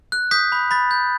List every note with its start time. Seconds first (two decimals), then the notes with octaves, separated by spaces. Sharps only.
0.12 F#6
0.31 D#6 G6 B6
0.52 B5
0.71 B5 A6
0.91 G6